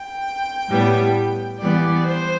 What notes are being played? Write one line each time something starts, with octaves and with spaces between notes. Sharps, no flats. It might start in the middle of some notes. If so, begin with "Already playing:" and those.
Already playing: G5
A2 G3 B3
E3 G3 B3 D5
C5